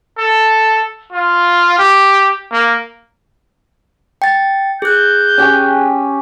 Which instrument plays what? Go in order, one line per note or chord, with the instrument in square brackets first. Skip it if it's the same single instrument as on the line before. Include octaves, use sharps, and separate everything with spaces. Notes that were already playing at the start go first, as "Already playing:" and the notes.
[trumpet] A4
F4
G4
A#3
[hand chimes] G5 A6
[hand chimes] G#4 F#6 [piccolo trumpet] G6
[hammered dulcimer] C#4 G4 G#5